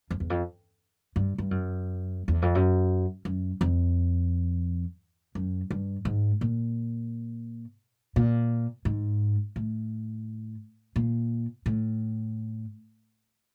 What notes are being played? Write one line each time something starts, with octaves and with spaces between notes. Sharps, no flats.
F2
E2
F2
G2
G2
F#2
E2
F2
F#2
F#2
F2
F#2
G2
G#2
A#2
A#2
G#2
A2
A#2
A2